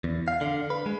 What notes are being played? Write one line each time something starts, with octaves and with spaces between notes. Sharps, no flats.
E2
F5
D3
B4
G#3